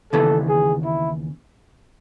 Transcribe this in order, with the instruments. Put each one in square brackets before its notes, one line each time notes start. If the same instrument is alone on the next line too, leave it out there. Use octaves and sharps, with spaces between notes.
[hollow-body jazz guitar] D#2 C#3 E3 B3 [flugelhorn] A4
[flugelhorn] G#4
E4